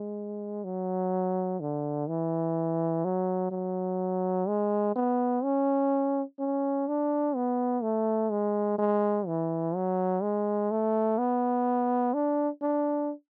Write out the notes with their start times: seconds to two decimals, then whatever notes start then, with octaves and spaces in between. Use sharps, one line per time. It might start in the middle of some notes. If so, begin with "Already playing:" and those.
Already playing: G#3
0.64 F#3
1.61 D3
2.09 E3
3.05 F#3
3.52 F#3
4.48 G#3
4.96 B3
5.44 C#4
6.40 C#4
6.88 D4
7.36 B3
7.83 A3
8.31 G#3
8.79 G#3
9.27 E3
9.75 F#3
10.22 G#3
10.71 A3
11.18 B3
12.14 D4
12.62 D4